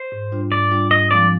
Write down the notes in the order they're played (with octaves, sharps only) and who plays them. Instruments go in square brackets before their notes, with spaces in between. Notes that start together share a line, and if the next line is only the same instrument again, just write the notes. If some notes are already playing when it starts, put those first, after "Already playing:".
Already playing: [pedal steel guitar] C5
[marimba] G#2
G3 D4 F4
[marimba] G#2 [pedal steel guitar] D5
[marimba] G3 D4 F4
[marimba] G#2 [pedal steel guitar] D#5
[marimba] F3 G#3 C4 [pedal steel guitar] D5